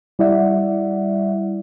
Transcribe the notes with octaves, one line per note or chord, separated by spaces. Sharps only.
G3 E4 D5 E5 F#5